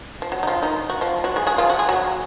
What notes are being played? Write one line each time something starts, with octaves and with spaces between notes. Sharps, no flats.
F3
F#3
D#4
F3 F4
D#3 D#4
F#4
F3 F4
F#3 F#4
G#3 G#4
G#3 G#4
F3 F4
F#4
G#4
F#3 F#4